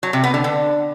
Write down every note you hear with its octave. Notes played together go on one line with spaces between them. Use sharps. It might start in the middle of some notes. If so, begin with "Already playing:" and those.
F#3
C3
B3
D3
D3